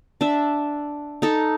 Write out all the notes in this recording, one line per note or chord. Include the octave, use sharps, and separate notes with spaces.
D4 E5
D#4 A4